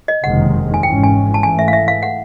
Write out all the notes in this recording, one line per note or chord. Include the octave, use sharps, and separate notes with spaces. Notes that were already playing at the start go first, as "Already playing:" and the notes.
D#5
F#1 F2 C3 D#3 G#3 F#5
G#5
G#1 G#2 E3 G#3 C#4 G5
G#5
A5
G#2 E3 A3 G#5
E5
F5
E5
F5
F#5